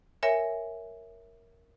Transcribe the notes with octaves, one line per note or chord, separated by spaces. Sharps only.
A#4 C#5 E5 G#5